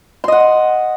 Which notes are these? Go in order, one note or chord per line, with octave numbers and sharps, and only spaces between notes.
D#5 F#5 C6